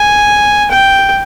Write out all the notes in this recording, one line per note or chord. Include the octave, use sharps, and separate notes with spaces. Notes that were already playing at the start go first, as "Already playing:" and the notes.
Already playing: G#5
G5